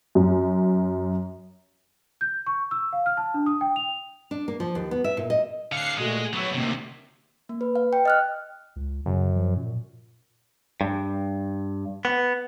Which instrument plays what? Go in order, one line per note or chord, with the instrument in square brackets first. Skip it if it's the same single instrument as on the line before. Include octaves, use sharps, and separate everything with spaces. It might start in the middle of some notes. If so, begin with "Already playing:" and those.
[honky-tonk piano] F#2
[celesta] G6
C#6
E6
F5
F6
A5
D4
D#6
G5
F7
[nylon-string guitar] D4
A#3
F3
D#2
B3
E5
A#2
D#5
[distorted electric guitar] D3 F5 [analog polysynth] F#6 C7 C#7
[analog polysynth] A#2 A3 F#4 [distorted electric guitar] G#3
[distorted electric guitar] F#3 B3 [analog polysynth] C#5 E6
[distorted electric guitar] D2 C3 [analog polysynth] D#3 A#3 C4
[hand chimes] A#3
B4
F5
G5
D#5 F6 F#6
[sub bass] C#2
[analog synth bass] F#2 [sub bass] C#3
[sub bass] F3
A#2
[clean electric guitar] G2
B3